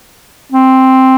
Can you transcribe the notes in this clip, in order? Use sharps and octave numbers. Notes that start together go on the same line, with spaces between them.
C4